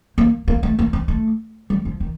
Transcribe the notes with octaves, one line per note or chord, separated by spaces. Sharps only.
A#3
A#3
A3
A#3
C4
A3
G3
F3
D#3